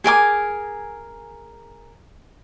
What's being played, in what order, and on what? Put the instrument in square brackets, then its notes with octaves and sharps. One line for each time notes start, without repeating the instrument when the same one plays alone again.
[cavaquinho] G#4 A#4 G#5 D6